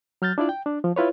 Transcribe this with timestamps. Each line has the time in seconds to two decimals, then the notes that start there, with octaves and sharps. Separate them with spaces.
0.22 F#3 F6 G6 A6
0.38 D4 E4 F4 D5
0.49 G5
0.66 D4
0.84 F3
0.96 E4 F4 B4 C#5